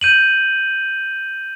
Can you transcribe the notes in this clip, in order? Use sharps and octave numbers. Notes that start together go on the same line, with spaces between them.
G6 D#7 F#7